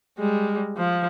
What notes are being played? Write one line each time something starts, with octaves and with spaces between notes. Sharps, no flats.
G3 G#3
F3